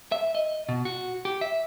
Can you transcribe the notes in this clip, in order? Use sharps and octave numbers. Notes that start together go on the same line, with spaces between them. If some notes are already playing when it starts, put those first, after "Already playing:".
E5
D#5
B2
F#4
G4
E5